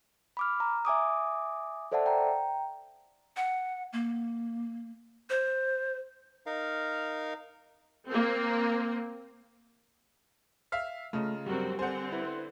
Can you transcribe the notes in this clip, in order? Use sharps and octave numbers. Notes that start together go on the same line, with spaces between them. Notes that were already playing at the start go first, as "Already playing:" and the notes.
B5 D6 F6
A#5
E5 G#5 D6 D#6
A4 C5 D5 E5 F#5 A5
G5 A#5
F#5
A#3
C5
D#4 A#4 F5
A#3 C4
E5 F5 F6
C#3 A3 F4 D#5 A#5
G2 F#3 G3 C4 F#4 A#4
D3 C4 C5 F#5 G#5 G6
E4 B4